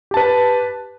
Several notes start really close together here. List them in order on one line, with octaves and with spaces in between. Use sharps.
G4 A5 B4